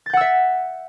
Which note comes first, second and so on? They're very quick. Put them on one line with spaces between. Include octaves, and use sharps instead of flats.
A6 G6 F#5 E6 E5